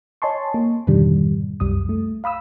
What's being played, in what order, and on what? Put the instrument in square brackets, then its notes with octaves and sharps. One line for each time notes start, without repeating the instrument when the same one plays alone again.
[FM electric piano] C#5 D#5 G#5 A5 C6 C#6
A#3
F2 G#2 B2 D3 D#3 G3
C2 F#2 G3 D#6
A3
F5 B5 D#6 E6